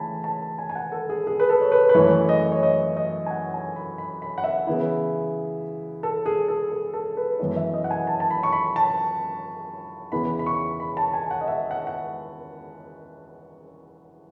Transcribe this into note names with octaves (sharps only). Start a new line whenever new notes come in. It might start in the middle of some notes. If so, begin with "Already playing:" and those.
Already playing: C#3 E3 A3 G#5 A5 B5
A5
G#5
G#5
F#5
A4
G#4
G#4
B4
A4
C#5
B4
B4
F#2 E3 A3 E4 C#5
D#5
C#5
D#5
D#5
G#5
F#5
G#5
B5
B5
B5
F#5
E5
C#3 E3 B3 E4
A4
G#4
A4
G#4
A4
B4
F#2 E3 B3 E4 C#5
E5
D#5
F#5
G#5
A5
A5
B5
C#6
B5
A5
E2 C#3 E3 B3 B5
B5
C#6
B5
A5
G#5
G#5
F#5
D#5
E5
F#5
F#5